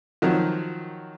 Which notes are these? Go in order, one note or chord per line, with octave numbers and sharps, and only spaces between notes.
D#3 F3 F#3